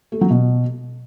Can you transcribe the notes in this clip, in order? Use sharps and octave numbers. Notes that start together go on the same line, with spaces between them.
A3
F#3
B2